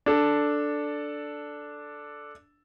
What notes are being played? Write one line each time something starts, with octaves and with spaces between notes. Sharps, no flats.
D4 A4